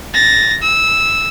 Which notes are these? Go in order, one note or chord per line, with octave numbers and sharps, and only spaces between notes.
A6 A#6
E6